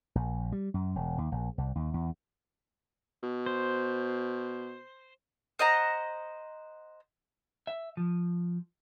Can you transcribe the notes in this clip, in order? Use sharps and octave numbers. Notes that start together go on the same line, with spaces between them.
A#1
G3
F#2
E1
D#2
A#1
C2
D#2
E2
B2
C5
C5 D#5 F#5 A#5
E5
F3